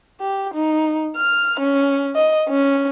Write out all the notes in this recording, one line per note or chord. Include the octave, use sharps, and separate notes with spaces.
G4
D#4
F6
C#4
D#5
C#4